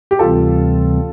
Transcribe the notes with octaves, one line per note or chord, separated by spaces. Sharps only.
G4
D2 C3 E3 G3 C4 F4 A4